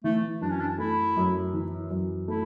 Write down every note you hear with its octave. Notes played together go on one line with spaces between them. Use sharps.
E3 A3
F#2 D4
C#4
D4
A3 E4
F#2
E3
F#2
A3 E4